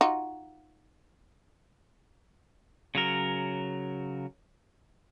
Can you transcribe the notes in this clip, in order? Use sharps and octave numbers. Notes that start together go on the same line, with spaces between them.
D#4 F4 F#4
C#3 F#3 A#4